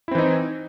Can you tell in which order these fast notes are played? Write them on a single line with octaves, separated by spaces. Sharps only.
E4 C4 E3 D#4